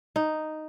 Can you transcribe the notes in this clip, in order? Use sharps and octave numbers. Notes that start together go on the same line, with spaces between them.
D#4